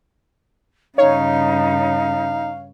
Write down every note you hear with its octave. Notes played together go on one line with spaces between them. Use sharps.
G2 C#3 D#4 C#5 F5